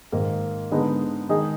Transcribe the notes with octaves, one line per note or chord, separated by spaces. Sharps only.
G#2 D#3 A#3
D3 G#3 B3 D#4
D#3 G#3 D#4 G#4